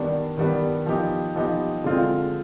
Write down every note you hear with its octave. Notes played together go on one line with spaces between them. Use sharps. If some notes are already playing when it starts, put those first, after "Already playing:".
Already playing: D#3 G3 B3 D4
D#3 G3 B3 D4
F3 B3 D#4 G4
F3 B3 D#4 G4
D3 G#3 C4 F4